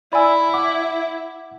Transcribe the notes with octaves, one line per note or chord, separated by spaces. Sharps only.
E4 D5 G#5 B5 E6
F#5 D6